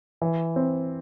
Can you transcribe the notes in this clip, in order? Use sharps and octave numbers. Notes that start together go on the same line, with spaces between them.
E3
C4